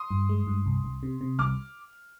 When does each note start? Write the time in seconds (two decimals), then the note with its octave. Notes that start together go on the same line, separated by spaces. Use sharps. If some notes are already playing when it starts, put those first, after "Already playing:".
Already playing: C6 D#6
0.11 G2
0.29 G#3
0.47 G2
0.66 C2
0.84 C2
1.03 C3
1.21 C3
1.39 C2 D6 F6